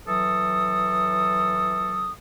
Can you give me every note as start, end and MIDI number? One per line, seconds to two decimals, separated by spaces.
0.08 2.11 52
0.08 2.11 54
0.08 2.11 69
0.08 2.11 87